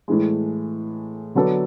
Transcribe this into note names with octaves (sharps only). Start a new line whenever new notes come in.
A2 E3 G#3
D3 F#3 B3 D4 A4